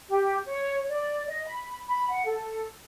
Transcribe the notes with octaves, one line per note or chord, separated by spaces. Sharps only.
G4
C#5
D5
D#5
B5
B5
F#5
A4